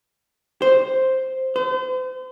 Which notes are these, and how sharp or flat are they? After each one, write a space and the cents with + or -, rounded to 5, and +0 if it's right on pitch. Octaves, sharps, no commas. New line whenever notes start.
C5 +0
C5 -40